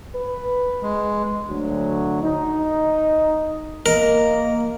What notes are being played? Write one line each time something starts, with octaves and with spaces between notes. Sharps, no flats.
B4
G#3
D2 F#3
D#4
A#3 A#4 D#5